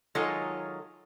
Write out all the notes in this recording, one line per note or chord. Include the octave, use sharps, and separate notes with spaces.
D#3 F#3 G#3 F4 A4 C#5